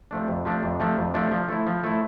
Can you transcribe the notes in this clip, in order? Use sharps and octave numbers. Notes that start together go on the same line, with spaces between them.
C3 F3 A3 D4
F2
C3 F3 A3 D4
F2
C3 F3 A3 D4
F2
C3 F3 A3 D4
F3
A3 E4
F3
A3 E4